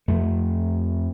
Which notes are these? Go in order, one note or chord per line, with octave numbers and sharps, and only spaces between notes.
F2 A3